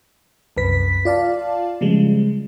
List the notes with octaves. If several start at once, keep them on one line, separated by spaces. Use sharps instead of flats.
C2 F#2 B4 B6
F4 D5 F5 A5
C#3 F3 G3 G#3